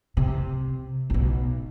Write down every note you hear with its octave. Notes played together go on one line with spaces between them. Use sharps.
C3
B1 B2